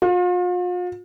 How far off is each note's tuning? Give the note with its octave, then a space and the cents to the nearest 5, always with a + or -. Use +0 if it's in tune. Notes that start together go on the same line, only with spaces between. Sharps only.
F4 +40